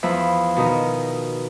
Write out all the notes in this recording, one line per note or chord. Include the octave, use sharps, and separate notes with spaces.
E2 F3 E5 B5
B2 D#3 D#4